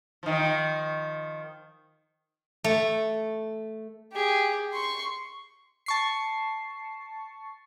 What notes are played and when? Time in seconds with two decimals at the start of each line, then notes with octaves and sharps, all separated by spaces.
0.23 D#3 F3
2.64 A3
4.12 G4 G#4
4.73 C6 C#6
5.86 A5 C#6 C7